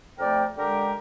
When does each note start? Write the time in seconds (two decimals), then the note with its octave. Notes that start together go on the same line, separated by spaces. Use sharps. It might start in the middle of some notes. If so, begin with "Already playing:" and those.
0.19 F2 A3 A#4 D5 G5
0.57 D3 G#3 G4 A#4 G5